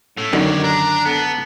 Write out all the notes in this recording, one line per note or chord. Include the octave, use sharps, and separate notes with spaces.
A2 A3 C#4
F#2 D3 D#3 A#3 G4 C#5
D4 A#5
B3 A4